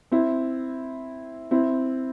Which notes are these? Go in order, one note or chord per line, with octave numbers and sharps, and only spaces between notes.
C4 E4
C4 E4